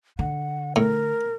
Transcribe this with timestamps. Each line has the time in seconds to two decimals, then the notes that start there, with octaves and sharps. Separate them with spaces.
0.19 D3 F#5
0.76 A2 A#4